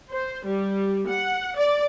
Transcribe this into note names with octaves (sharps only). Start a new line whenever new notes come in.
C5
G3
F#5
D5